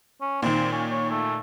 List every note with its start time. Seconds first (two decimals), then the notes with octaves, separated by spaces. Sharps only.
0.21 C#4
0.42 A#2 D#3 C4
0.72 C#4
0.91 C#5
1.11 A3